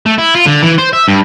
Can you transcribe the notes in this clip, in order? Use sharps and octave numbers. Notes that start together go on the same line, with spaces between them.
A3
E4
F4
D3
E3
C5
E5
G2